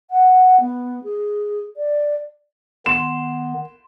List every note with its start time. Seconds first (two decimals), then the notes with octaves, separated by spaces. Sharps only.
0.11 F#5
0.60 B3
1.04 G#4
1.77 D5
2.86 D#3 B3 C6 E7